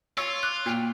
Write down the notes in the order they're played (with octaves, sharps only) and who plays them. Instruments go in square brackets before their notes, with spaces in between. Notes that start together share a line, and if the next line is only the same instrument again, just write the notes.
[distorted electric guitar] F4 [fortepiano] C#5 [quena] C#6 [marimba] E6
[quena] D6 [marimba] F#6
[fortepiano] A#2 [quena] G5